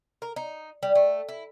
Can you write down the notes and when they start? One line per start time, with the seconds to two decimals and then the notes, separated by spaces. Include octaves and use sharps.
0.22 A#4
0.36 D#4
0.83 G3
0.95 A3
1.28 E4